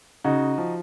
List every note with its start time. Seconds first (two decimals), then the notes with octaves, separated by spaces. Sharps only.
0.24 C#3 D#4 F#4
0.58 F3